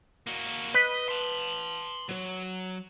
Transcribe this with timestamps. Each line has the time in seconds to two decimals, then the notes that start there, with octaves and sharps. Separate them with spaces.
0.27 A#3 F#4
0.74 B4 D#5
1.09 A5 C6
2.09 F#3